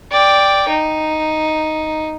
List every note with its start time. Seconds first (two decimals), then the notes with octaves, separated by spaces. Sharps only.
0.12 D5 G5
0.69 D#4